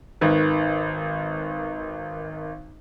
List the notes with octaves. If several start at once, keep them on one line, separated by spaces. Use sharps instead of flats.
G#1 D#3 B4